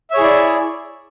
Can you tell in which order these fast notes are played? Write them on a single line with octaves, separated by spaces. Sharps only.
E5 C#5 G#4 E4 D5